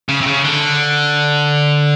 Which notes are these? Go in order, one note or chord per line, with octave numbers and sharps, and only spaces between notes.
C#3
C3
C#3
D3